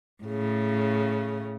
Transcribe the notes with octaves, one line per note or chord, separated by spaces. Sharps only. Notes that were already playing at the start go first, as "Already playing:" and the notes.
A2 C#3